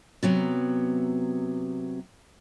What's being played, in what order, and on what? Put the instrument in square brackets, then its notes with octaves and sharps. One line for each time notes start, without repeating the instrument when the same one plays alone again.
[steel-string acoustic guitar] C3 F#3 B3